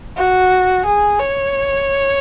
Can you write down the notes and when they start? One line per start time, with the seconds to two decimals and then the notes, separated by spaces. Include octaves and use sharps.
0.17 F#4
0.86 G#4
1.20 C#5